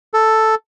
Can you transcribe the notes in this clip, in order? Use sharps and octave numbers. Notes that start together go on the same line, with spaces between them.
A4